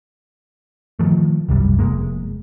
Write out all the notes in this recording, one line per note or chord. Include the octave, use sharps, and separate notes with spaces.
D#3 F3 A3
F1 C2 F#2 G3
F1 D#2 G#3 A#3